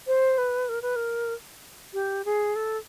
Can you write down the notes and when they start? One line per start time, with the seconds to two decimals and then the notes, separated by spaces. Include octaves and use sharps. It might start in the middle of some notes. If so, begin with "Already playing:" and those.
0.07 C5
0.38 B4
0.69 A#4
0.82 B4
0.96 A#4
1.93 G4
2.25 G#4
2.56 A4